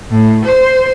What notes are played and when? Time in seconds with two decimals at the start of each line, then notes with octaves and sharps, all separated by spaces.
0.11 A2
0.45 C5